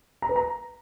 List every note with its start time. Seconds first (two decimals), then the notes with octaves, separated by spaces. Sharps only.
0.22 A#5
0.29 B4
0.36 A#5